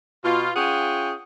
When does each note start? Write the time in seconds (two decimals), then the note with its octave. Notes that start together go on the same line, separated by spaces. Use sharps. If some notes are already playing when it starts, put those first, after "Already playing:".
0.25 B2 F4
0.56 C#4 F4 G#4 F#5 G5